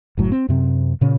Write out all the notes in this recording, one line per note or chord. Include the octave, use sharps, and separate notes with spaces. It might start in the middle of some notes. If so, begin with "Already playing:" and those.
F#1 A2 F#3
C4
F#2 C3 C4
A#2 C#3 C#4